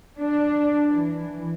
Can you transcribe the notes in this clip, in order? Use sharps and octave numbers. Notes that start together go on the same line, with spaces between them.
D4
E3